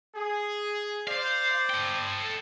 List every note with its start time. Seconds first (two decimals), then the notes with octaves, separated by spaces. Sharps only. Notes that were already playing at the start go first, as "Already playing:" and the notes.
0.15 G#4
1.07 C5 D5 F5
1.70 A4 G5